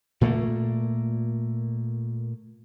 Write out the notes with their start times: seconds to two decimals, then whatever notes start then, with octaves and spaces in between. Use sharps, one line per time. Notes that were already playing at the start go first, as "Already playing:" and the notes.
0.21 A#2 A3 A#3